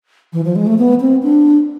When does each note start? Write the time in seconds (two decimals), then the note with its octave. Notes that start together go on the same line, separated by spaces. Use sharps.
0.33 E3
0.45 F3
0.56 G#3
0.67 A3
0.78 B3
1.00 C4
1.23 D4